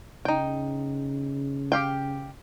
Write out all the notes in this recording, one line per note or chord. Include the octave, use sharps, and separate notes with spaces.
C#3 D#4 G5
G4 F5 G5